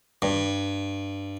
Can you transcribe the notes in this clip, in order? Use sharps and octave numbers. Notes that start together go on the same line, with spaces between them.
G2